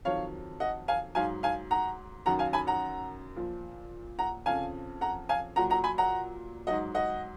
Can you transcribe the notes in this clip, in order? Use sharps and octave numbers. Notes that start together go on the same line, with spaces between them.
F2 D#3 F#3 C#5 F5
D#5 F#5
F5 G#5
G#2 F#3 F5 G#5
F5 G#5
F#5 A#5
F#2 D#3 F#3 F#5 A#5
F5 G#5
G#5 B5
F#5 A#5
A#2 F3
F#5 A#5
F2 C#3 F3 F5 G#5
F#5 A#5
F5 G#5
A#2 F#3 F#5 A#5
F#5 A#5
G#5 B5
F#5 A#5
G#2 F#3 D#5 F#5
D#5 F#5